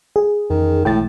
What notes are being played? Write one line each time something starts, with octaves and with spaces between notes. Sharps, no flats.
G#4
F2 D#3 E3 C#4
B1 A2 E3 G#3 G5 A6